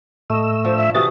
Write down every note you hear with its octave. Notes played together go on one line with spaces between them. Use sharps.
A2 A3 D#5 E6
F3 D4 C5
E5
C3 E3 F#4 D#6 A6